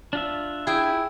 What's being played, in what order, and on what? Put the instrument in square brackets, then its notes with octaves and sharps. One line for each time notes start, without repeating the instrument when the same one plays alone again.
[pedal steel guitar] D4 F4 E5
[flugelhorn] E4 [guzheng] G#4 G5